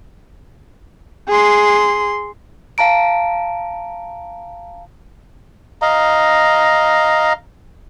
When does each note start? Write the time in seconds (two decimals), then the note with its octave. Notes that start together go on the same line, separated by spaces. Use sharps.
1.28 G#4 C6
2.78 F5 A5 A#5 D7
5.82 D#5 F5 A#5